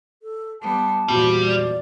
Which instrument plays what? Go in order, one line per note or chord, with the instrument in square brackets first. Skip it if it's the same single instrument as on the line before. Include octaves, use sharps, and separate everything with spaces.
[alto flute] A4
[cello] G3 B3 [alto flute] A5
[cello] E2 F3 [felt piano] A#2 F#4 [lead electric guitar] G3
[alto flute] D5